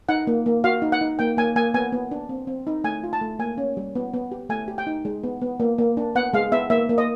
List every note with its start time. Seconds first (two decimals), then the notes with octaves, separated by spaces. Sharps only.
0.09 D#4 F#5
0.27 A#3
0.46 A#3
0.64 F#4 F5
0.82 D#4
0.92 F#5
1.01 D#4
1.19 A#3 G5
1.37 A#3 G#5
1.56 A#3 G#5
1.74 B3 G#5
1.92 B3
2.11 D4
2.29 C4
2.47 C4
2.67 D#4
2.84 A3 G#5
3.04 F4
3.13 A5
3.21 A3
3.39 A#3 G#5
3.58 C#4
3.77 G3
3.95 B3
4.14 B3
4.32 G4
4.49 A3 G#5
4.68 G4
4.78 G5
4.87 D#4
5.05 G#3
5.23 B3
5.42 B3
5.60 A#3
5.78 A#3
5.97 D4
6.15 B3 F#5
6.33 G#3 F5
6.52 B3 E5
6.70 A#3 E5
6.89 A#3
6.98 D#5